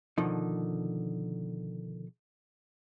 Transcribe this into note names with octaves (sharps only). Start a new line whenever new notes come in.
B2 D3 D#3 F3 D#4